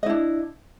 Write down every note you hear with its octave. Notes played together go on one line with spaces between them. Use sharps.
D4 E4 D#5